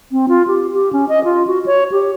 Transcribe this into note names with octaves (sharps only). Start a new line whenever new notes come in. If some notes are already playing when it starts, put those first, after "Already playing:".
C4
F4
G4
G4
C#4
D#5
F4
F#4
C#5
G4